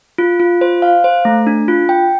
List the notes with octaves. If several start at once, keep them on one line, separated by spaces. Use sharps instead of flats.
F4
F4
C5
F5
C5
A3
D4
F4
G5